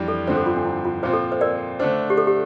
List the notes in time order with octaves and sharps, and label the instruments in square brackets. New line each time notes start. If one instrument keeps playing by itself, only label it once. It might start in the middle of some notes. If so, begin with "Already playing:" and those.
Already playing: [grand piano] F2 E3 G3 D4
[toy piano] A4
[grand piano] G2 D3 F3 C4 [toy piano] C5
[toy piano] A4
F4
D4
E4
F4
[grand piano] A#2 F3 C4 F4 [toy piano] C5
[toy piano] A4
C5
A#4 D5
[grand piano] D3 A3 D4 [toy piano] C5
[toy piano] G4
A4
G4